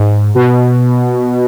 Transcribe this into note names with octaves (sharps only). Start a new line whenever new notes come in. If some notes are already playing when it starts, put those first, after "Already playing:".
Already playing: G#2
B2